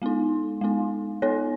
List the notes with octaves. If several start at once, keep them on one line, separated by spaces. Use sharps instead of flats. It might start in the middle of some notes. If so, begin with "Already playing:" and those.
G#3 B3 D#4
G#3 B3 D#4
B3 D#4 A4 C#5